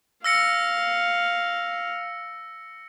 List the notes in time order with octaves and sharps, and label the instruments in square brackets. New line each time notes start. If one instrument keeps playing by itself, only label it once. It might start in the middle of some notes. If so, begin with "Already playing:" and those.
[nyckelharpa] F5 [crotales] E6 A#6 C#7